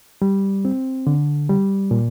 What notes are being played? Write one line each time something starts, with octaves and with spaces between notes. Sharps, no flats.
G3
C4
D3
G3
A#2